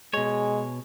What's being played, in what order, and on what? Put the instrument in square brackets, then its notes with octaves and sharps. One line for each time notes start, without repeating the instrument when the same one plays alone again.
[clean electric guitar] B2 C#5 [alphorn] G#3